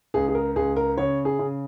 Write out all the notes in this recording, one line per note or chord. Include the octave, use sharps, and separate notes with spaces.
C#2 G#4
G#4
A#4
C#2 G#4
A#4
C#3 C#5
G#4
C#3